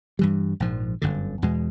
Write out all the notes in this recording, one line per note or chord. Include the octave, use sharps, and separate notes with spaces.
G2 E3 G3
A#1 G#2 F3
G1 F#2 D3
E2 B2 G#3